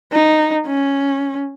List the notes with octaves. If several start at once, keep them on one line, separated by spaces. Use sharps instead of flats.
D#4
C#4